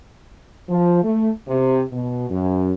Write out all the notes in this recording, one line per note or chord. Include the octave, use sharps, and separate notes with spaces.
F3
A3
C3
B2
F#2